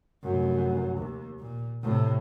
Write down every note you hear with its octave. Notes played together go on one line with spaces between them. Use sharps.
F1 F#2
D#2
A#2
A2 C3